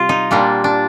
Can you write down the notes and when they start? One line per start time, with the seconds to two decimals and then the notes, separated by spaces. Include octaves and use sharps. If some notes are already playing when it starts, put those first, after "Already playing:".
Already playing: C3 G3 F4
0.09 D#4
0.31 A#2 G3 A#3 D4
0.64 D4